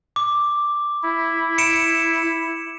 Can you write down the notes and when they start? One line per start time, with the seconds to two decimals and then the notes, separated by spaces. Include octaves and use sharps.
0.16 D6
1.03 E4
1.58 C#7 D7 E7